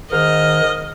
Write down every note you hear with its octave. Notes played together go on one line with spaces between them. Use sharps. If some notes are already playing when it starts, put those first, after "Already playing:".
G#2 D#3 D#5 F6